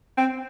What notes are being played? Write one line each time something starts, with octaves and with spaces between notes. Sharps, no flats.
C4